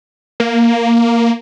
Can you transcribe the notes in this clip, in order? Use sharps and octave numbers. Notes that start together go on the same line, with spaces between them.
A#3